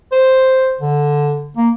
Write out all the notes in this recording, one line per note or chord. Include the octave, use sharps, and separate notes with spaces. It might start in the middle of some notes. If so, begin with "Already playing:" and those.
C5
D3
A#3